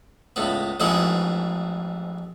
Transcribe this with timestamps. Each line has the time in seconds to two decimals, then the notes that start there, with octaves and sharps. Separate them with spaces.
0.36 C#2 A2 B3
0.80 A1 F2 G#2 E3 G#4 F#5